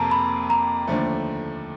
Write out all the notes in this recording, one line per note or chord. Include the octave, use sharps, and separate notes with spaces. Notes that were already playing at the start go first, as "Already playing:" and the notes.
Already playing: F2 C3 A#3 A5 A#5
B5
A#5
D#2 D3 F3 A3